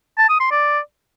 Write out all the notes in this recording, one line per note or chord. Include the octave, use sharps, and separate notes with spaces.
A5
D#6
C6
D5